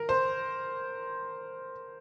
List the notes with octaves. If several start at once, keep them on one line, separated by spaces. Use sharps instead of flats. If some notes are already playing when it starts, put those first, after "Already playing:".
Already playing: A#4
C5